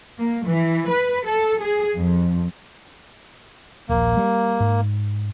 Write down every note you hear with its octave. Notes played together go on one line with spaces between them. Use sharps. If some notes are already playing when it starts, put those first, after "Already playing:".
A#3
E3
B4
A4
G#4
F2
D#1 A#1 A#3
G3
G#2